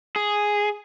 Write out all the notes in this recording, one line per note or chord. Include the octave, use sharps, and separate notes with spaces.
G#4